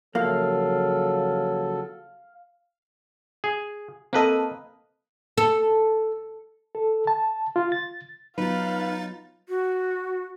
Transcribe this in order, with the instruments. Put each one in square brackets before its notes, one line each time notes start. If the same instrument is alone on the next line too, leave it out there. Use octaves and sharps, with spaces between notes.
[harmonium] C#3 F#3 A4 [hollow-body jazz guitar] F3 A#3 [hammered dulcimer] F5
[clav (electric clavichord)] G#4
[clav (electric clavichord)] A#3 B4 D#5 [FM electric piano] C4 A4
[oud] A4
[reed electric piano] A4
A5
F4
A6
[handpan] F#3 B3 F4 [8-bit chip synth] D#4 A6 [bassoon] B4 [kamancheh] F5
[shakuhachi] F#4